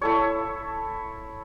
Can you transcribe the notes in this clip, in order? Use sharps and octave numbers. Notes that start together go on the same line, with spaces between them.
E4 A4 C#5